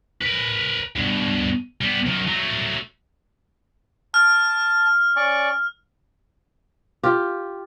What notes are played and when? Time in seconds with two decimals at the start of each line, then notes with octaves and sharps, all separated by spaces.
0.21 A#4 B4
0.96 G2 B2
1.81 G3 B3
2.06 F#2 D#3
2.28 F#3 A3
4.14 A5 F6
5.16 C#4 D5 C#6
7.03 F4 G4